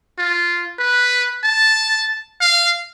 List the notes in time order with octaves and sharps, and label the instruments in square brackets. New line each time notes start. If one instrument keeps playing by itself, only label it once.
[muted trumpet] F4
B4
A5
F5